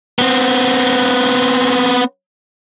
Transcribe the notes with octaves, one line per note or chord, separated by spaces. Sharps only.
B3 C4